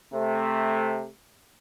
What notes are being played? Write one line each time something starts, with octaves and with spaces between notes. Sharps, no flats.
C3 A3